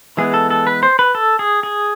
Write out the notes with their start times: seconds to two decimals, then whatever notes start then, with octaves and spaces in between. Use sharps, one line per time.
0.17 E3 G#3 B3 G#4
0.34 A4
0.50 A4
0.67 B4
0.83 C5
0.99 B4
1.15 A4
1.39 G#4
1.63 G#4